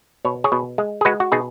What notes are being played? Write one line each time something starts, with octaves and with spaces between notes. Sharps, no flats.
B2 C#5
G#4 C#5
B2
G#3
G#4
G#3 F#4 B4
F#4
B2 D#4 G#4